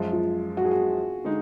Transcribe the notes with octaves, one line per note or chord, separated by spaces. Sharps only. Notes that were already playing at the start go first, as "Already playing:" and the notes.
Already playing: F#2 F3 G#3
F4
F#4
G#4
F#4
D3 G#3 D#4